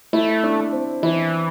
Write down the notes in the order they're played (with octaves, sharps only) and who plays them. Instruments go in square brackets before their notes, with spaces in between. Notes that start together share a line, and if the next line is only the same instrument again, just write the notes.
[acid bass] A3 [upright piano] E4
[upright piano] D4
C4
[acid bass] E3 [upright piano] E4